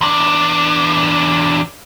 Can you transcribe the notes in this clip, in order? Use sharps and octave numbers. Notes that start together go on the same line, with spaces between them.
E2 D4